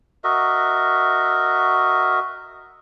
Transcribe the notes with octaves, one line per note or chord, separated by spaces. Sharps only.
F#4 A#4 D#5 E5